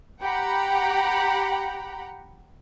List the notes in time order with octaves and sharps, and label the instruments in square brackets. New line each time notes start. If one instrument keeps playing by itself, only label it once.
[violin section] G4 F#5 G5 A#5 B5